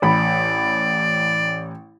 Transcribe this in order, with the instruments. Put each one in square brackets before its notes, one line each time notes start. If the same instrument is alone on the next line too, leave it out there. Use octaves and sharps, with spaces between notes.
[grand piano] A1 B5 [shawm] D5